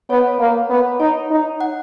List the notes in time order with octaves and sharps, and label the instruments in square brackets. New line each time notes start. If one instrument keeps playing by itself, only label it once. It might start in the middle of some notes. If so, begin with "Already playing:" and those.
[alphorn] B3 [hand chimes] C#5
[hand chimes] D#5
C#5
[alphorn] A#3 [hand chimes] C#5
[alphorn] B3
[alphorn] D#4 [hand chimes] C#5
[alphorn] D#4
[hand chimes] F#5